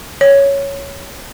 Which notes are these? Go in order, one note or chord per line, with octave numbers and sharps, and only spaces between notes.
C#5